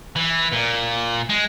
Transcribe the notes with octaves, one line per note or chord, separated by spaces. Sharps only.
E3
A#2
G#3